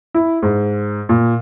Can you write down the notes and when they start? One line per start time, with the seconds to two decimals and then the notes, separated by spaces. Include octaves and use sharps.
0.14 E4
0.43 G#2
1.09 A#2